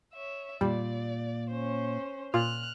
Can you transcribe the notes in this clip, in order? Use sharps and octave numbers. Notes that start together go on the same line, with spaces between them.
C#5 E5
A#2 G3 D5
C#4 C5
A#2 F4 F6 F#6